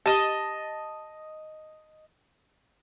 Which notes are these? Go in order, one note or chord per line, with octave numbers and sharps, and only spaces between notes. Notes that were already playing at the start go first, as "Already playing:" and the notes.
G4 D#5 A5